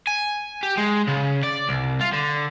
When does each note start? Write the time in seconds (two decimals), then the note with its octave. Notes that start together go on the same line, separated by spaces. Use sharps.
0.07 G#5
0.63 G4
0.77 G#3
1.07 C#3
1.43 D5
1.69 C2
2.01 F4
2.13 D3